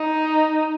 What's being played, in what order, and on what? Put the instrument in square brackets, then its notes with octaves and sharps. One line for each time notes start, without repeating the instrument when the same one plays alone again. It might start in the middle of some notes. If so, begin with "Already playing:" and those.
Already playing: [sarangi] D#4